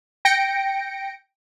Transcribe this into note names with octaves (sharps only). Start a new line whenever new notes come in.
G5 A#6 C#7 D7